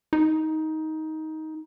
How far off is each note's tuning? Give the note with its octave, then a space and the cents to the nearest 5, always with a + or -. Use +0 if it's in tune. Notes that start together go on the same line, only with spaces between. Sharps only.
D#4 +15